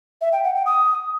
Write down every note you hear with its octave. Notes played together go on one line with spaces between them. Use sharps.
E5
G5
F#5
G5
D#6